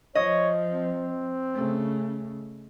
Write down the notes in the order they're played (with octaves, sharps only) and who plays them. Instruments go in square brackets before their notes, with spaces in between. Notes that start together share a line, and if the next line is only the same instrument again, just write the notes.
[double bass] F3 [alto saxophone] C#5 [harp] D#5
[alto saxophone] C4
[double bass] C#3 A3